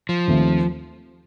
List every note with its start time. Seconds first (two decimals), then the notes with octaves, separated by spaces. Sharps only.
0.09 F3
0.28 D#2 D#3 A3 C4